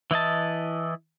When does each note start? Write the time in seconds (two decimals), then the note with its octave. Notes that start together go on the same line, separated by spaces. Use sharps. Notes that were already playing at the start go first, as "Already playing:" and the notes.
0.11 E3 E4 D#5 A5